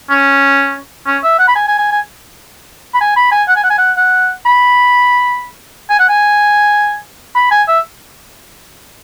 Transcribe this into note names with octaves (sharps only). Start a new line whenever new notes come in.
C#4
C#4
E5
F#5
B5
G#5
G#5
G#5
G#5
B5
G#5
B5
G#5
F#5
G#5
F#5
G#5
F#5
F#5
B5
G#5
F#5
G#5
B5
G#5
E5